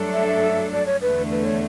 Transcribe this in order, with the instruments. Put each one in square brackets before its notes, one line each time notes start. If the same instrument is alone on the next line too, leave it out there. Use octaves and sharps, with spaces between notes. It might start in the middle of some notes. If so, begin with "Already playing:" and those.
Already playing: [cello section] G2 F#3 A3 D4 A4
[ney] E5
E5
D5
C#5
[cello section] E2 D3 A3 [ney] B4
[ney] B4
C#5